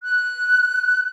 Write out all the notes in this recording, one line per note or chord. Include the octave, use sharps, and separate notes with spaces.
F#6